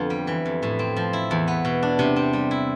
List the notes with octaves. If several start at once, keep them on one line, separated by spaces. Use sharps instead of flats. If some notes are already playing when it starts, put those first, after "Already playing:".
Already playing: F2 D3 B3 F4
G3
E3
F2
A2
C4
F3
E4
E2
B3
B2
D4
C3
C4
G3
E4